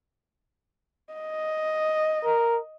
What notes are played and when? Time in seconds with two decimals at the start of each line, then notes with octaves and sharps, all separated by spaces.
1.14 D#5
2.25 A#4